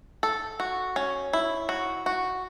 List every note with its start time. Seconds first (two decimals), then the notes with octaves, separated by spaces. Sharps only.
0.23 A4
0.60 F#4
0.96 C#4
1.33 E4
1.69 F#4
2.06 F#4